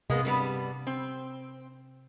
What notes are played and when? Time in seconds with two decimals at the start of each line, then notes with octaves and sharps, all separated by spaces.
0.10 C3 G#3 A#3 B3
0.25 G2 G3 B3
0.87 C4